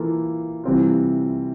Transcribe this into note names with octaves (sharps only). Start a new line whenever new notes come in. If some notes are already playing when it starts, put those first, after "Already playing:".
Already playing: E3 A#3 F4 A4
C3 E3 G3 C4 F4